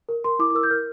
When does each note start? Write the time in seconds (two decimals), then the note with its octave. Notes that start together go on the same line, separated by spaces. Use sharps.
0.09 A#4
0.24 A#4 C6
0.39 E4 D6
0.50 D6
0.55 A#4 E6
0.63 G6
0.71 A#4 F6